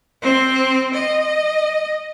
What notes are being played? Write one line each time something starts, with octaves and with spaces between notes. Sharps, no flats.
C4
D#5